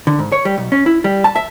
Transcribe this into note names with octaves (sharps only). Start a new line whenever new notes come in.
D3
G#2
C#5
G3
B1
C#4
E4
G3
A5
E5